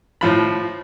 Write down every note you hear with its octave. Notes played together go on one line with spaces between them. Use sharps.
A2 F3 B5